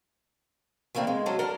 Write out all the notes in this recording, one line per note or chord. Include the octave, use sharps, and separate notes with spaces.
E3 A3 A#3 C4 D4
G#3
F#3 C#4 A4 C5
D4 A4 A#4